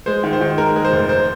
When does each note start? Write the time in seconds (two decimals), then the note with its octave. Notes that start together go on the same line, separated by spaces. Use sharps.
0.06 G#3 C5
0.24 D#3
0.33 C5
0.41 D#3
0.58 G#3 A#4
0.76 G#3
0.85 C5
0.93 F1
1.09 C5